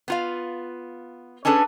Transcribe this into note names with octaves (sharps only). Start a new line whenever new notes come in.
B3 F4 F5
C#4 D4 G#4 A4 B4